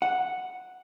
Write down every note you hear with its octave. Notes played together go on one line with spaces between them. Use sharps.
F#5